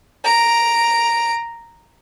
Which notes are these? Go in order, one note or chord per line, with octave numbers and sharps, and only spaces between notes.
A#5 D7